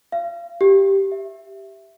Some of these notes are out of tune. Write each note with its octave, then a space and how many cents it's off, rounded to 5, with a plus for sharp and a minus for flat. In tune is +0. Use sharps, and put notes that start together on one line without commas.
F5 -35
G4 -5
E5 +5